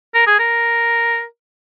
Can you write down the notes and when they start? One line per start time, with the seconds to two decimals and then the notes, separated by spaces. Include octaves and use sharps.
0.15 A#4
0.27 G#4
0.39 A#4